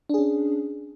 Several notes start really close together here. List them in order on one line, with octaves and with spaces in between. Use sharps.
D4 G#4 C#4